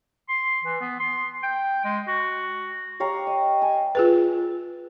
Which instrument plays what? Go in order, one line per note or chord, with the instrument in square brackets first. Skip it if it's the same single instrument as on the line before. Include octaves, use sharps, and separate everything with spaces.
[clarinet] C6
E3
B3
C6
G5
G#3
F#4
[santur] G4 C#5 F5 A#5
D#5
G#5
[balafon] F4 G#4 B4